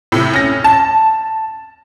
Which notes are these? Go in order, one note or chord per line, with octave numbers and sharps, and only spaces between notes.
A2 C3
C#4 A#6
A5